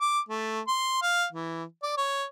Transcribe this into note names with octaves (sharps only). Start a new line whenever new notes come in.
D6
A3
C6
F5
E3
D5
C#5